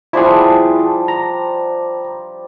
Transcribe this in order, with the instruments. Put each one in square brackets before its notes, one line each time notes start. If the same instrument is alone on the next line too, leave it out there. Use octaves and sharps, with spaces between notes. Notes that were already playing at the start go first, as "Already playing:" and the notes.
[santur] F3 G3 D4 [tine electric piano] E4 G#4
[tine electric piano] A#5